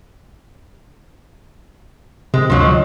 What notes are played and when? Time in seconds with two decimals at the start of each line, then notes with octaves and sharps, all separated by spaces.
2.34 C3 G#3
2.50 D2 G2 F3 F#3 D#5